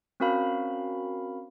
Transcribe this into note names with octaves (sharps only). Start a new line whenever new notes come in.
C4 C#4 F#4 A#4 F5 B5